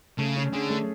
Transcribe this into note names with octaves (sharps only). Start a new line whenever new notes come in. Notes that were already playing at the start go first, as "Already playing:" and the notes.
C#3 A3
C#4
D3 G#4
A3